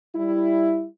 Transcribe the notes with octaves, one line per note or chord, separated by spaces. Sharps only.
G3 E4